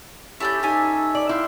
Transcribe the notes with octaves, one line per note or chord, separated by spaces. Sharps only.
C#4 E4 G4 A4 D5 E5 G6
D#4 G4 G#5
D5
E4 F5 G5 C6